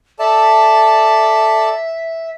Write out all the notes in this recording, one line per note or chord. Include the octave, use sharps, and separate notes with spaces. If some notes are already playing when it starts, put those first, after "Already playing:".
A4 D5 E5 A5